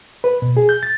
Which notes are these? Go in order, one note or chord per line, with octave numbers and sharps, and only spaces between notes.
B4
B2
G#4
G6
A6